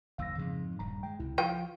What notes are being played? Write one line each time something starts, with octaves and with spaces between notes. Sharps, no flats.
F#1 D#2 F5 E6 A#6
F2 G#2 C#3
D#1 G2 A#5
G#3 G5
C#2 C3 E4
F3 F4 G5